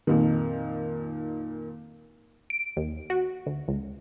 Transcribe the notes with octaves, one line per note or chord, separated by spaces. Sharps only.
F2 A#2 D#3
D7
D#2
F#4
D2
C#2